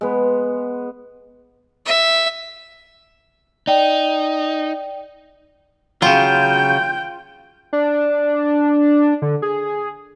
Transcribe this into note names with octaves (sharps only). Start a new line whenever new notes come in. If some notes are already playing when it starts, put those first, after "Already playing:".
G#3 B3
E5
D#4 D5 G5
C#3 F#3 F4 G5 G6
D4
D3
G#4